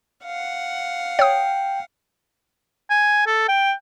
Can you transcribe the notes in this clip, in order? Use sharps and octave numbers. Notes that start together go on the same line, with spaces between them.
F5 F#5
C#5 G5 D#6
G#5
A4
G5